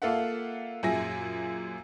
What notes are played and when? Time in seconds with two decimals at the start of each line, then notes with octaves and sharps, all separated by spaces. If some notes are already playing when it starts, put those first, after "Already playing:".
0.02 A#3 F4 A4 E5 F#5
0.83 F#2 A#2 G#4 E5 G#5 A#6